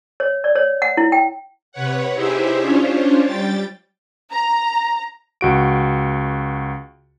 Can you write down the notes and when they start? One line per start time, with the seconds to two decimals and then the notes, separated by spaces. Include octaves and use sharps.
0.20 C#5
0.44 D5
0.55 C#5
0.82 F#5
0.97 E4
1.12 G5
1.72 C3 B4 C#5 F#5
2.13 D#4 E4 G4 G#4 C5 E5
2.57 C#4 D4 F4 C5 C#5
3.25 G3 G5 A6
4.32 A#5
5.41 C#2 F#4 D7